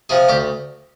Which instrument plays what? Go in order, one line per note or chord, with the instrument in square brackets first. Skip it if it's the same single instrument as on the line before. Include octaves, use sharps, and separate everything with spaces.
[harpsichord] C3 F3 G#4
D2 G4